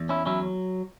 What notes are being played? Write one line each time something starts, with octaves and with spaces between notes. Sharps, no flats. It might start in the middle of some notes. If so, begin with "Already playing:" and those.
Already playing: E2
C#4 E4
F#3 C#4 E4